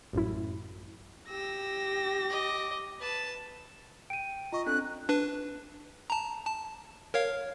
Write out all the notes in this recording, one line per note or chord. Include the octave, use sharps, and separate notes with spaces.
A1 F#2 E4
G4 E6 A#6
D#5 D6
B4 A5
G5 D7 D#7
F4 D#5 A#5 C#6
C4 D4 A4 F#6
D4 B4
A5 A#5
A5
A#4 C#5 F5